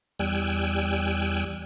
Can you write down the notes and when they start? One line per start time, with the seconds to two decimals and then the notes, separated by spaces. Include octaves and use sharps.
0.19 E2 G3 G5 G#5 E6 F#6